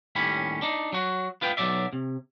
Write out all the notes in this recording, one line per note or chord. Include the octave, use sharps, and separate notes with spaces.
D#2 A2 G3 C#4 B5
D4 D#4
F#3 F#4
B3 F4 B4 G5
B1 A#2 F#3 D5 E5
C3